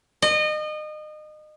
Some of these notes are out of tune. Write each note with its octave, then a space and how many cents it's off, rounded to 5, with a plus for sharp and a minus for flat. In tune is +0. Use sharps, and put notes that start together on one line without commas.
D#5 -30